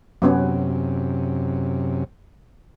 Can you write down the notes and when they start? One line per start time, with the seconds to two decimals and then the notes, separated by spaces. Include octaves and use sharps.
0.22 F#2 C3 F#3 B3 C#4